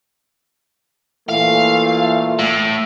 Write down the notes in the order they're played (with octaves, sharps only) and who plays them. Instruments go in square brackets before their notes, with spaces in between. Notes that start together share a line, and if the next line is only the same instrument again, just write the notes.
[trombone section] A#2 E3 A3 [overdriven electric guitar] F5
[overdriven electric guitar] A2